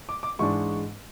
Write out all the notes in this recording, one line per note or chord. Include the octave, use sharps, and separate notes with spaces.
D6
D6
G#2 E3 G#3 D4 C#6